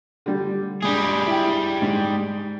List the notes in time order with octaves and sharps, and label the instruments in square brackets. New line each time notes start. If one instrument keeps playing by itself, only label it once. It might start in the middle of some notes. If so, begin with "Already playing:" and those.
[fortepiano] D3 G3
[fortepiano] G2 G#3 [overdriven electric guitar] G3 G#4
[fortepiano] E4 G5
G#2